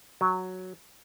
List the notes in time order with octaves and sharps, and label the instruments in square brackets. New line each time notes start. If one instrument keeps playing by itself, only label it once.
[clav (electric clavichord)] F#3